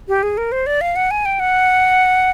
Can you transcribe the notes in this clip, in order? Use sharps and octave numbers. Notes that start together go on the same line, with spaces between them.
G4
G#4
A#4
C5
D5
F5
F#5
G#5
G5
F#5